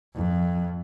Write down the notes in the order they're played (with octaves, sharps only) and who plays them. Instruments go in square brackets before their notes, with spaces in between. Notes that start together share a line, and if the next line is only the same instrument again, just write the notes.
[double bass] F2